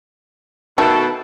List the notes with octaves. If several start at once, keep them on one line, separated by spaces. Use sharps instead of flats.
B2 D#3 A3 A4